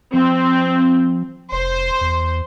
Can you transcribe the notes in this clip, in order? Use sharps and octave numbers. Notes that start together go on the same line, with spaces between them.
F3 C4
F1 C5
E2